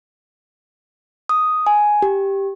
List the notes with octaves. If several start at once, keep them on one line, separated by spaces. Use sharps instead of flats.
D#6
G#5
G4